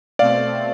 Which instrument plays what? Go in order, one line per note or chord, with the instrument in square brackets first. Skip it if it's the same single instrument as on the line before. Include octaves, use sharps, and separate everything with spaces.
[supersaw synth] B2 A3 C4 [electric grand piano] D5 F5